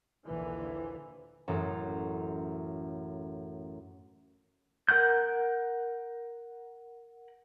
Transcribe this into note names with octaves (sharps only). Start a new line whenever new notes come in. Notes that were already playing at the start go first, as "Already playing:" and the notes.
A#1 D#2 D3 E3
A1 F#2
A#4 F#5 F#6 G6